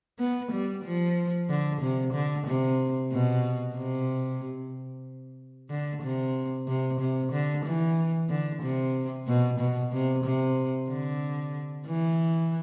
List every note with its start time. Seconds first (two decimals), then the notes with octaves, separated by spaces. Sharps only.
0.19 B3
0.52 G3
0.84 F3
1.49 D3
1.81 C3
2.13 D3
2.47 C3
3.12 B2
3.75 C3
5.70 D3
6.02 C3
6.68 C3
7.00 C3
7.32 D3
7.65 E3
8.29 D3
8.62 C3
9.28 B2
9.59 B2
9.92 C3
10.24 C3
10.89 D3
11.87 E3